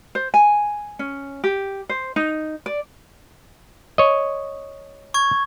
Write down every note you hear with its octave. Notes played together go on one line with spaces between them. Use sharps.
C5
G#5
C#4
G4
C5
D#4
D5
C#5 D#5
C#6 G#6